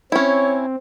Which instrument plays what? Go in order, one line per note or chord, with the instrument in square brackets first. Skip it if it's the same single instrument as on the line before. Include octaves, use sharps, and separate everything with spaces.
[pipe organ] C4 [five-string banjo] C#4 E4 [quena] C#5